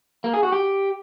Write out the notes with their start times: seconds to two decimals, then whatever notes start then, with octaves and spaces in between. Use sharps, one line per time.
0.24 A#3
0.33 G#4
0.43 F#4
0.52 G4